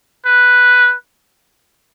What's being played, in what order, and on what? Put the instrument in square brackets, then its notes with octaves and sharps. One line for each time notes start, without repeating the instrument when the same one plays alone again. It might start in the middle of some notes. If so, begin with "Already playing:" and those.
[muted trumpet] B4